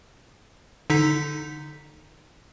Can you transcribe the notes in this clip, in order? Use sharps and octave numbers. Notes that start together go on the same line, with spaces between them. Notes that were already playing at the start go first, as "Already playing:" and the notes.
D3 D#4 B6